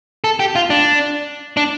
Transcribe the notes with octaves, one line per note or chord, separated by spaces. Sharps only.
A4
G4
F4
D4
D4